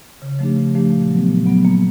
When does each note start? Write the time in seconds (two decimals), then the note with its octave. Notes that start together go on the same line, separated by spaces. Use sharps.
0.22 C#3
0.39 F3 A3 D4 G4
0.56 C#3
0.75 F3 A3 D4 G4
0.92 A#2
1.11 F#3 B3
1.29 A#2
1.46 F#3 B3
1.65 A#3